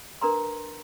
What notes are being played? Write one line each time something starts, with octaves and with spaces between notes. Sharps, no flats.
D4 A#4 B4 A#5 C6